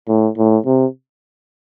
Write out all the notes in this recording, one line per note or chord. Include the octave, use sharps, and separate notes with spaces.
A2
A2
C3